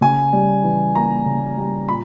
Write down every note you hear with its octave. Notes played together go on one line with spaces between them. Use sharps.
C#3 G#5
G3
E3
A#3 A#5
C#3
G3
A#2 B5